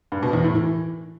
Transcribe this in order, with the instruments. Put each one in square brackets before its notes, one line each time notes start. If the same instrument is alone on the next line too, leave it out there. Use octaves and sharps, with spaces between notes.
[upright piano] G2
B2
E2
A2
E3